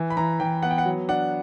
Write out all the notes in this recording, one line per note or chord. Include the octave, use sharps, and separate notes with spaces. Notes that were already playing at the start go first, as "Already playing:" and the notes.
Already playing: E3
B5
E3 A#5
E3 G5
B3 F#5
G5
F#5
F#3
D4 F#5